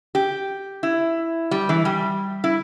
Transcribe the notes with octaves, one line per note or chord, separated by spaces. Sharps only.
G4
E4
G3
E3
G3
E4